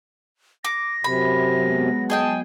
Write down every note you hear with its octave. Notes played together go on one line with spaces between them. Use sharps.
D6 A#6
F#2 C3 B5
F#3 G#3 B3
G#4 D#5 G5 A5